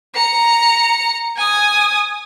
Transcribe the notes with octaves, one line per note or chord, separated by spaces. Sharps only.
A#5 C#7
G#5 D#6